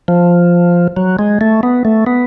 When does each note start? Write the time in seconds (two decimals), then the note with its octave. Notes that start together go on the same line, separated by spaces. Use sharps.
0.08 F3
0.97 F#3
1.19 G#3
1.41 A3
1.63 B3
1.85 A3
2.07 B3